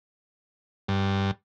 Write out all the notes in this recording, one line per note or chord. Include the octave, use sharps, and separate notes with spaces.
G2